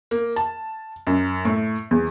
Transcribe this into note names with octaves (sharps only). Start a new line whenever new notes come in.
A#3
A5
F#2
A2
E2